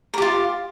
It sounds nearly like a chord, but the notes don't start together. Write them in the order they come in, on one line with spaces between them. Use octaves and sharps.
A#4 G4 F4